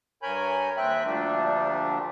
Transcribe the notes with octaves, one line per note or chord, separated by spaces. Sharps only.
G2 A#4 C#5 G#5 B5 G6
D#2 C4 E5 G5 F#6
D2 A#2 F3 G3 A3 D4